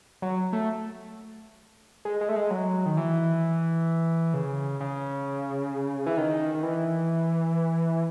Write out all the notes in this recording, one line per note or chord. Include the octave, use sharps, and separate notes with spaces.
F#3
A3
G#3
G#3
A3
G#3
F#3
D#3
E3
C#3
C#3
E3
D#3
D#3
E3